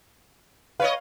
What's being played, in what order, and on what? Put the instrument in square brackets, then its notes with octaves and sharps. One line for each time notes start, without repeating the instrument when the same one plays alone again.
[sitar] B4 C#5 D#5 [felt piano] F5